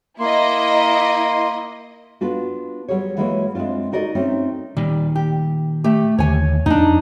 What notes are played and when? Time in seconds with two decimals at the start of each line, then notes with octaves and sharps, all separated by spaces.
0.20 A#3 E4 D#5 C6
2.21 B3 D4 F4 F#4
2.88 F#3 G3 G#4 C#5
3.17 E3 F#3 G#3 A#3 E4 C#5
3.55 G#3 A3 C4 D4 F4
3.92 D#4 F#4 A#4 D5 D#5
4.15 A3 C4 C#4 D#4
4.77 A#2 D#3 G3
5.16 G4
5.84 A3 G4
6.18 D#2 D3 A3 C#5 G#5
6.66 F2 D4 D#4